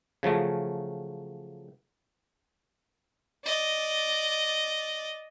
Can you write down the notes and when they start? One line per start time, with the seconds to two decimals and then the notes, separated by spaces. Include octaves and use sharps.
0.23 C#3 F3 F#3 A3
3.45 D5 D#5